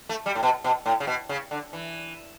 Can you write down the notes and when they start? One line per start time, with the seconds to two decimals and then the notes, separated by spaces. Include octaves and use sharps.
0.09 A3
0.26 G3
0.35 A2
0.43 B2
0.64 B2
0.86 A2
1.00 C#3
1.07 B2
1.29 C#3
1.51 D3
1.73 E3